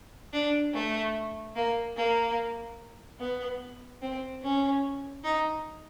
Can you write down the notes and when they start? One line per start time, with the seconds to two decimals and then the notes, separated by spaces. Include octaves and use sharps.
0.33 D4
0.74 A3
1.56 A#3
1.97 A#3
3.20 B3
4.02 C4
4.43 C#4
5.24 D#4